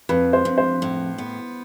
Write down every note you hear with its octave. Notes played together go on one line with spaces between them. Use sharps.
F2 B4
C5
F2
C5
A2
B3